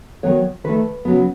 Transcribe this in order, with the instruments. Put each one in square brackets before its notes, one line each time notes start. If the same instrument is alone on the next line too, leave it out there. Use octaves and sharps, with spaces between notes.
[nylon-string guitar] D#3 F#3 B3 C#5
D#3 A3 B4
C#3 F#3 B3